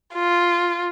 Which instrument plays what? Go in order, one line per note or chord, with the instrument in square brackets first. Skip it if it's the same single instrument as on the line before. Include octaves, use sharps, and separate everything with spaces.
[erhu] F4